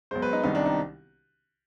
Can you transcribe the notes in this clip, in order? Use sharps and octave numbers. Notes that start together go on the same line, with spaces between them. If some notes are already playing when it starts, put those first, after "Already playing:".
B1 B2 G#3 C5
B4
D#4
C2 C3 D#3 G3 D#4
D4
D#4